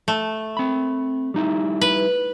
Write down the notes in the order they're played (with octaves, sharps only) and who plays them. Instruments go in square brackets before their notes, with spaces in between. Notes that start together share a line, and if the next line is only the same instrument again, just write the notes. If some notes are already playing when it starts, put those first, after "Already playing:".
[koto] A3
[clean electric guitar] C4 B5
G3 D#4 E4
[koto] B4